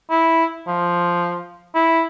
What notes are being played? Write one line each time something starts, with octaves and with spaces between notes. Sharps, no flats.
E4
F3
E4